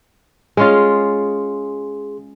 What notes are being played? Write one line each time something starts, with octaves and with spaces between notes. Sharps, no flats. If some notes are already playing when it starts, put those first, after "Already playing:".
G#3 C#4 F4 G#4 C6